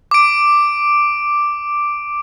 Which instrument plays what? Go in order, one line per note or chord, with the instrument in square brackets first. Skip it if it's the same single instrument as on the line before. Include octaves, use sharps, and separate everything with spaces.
[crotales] D6 D7